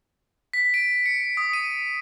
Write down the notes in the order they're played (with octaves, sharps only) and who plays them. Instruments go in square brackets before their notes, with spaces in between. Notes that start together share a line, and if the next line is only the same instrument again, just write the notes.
[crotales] B6
D7
C#7
D#6
D#7